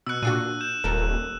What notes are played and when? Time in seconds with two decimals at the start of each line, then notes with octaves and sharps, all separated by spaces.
0.06 B2 E6 F#6 C#7
0.23 A#2 D4 F#4 D#7
0.61 G6 E7
0.84 D#1 A4 A#4